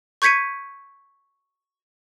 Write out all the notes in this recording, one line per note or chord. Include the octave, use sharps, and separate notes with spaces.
C#6 G6 G#6 B6 C#7 D#7